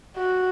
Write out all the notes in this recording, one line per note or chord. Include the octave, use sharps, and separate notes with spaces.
F#4